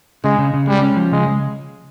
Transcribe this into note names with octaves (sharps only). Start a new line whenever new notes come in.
C#3 G#3
C#3
C#3
G3 G#3
C#4
F3
C#3 G#3
G#3